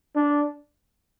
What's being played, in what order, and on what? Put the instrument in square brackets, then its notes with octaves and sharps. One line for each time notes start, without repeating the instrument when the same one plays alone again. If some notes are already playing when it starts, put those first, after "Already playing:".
[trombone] D4